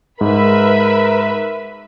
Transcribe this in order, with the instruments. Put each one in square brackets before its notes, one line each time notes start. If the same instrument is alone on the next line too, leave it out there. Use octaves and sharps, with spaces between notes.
[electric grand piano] G#2 [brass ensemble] A#4 [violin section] B4 E5 B5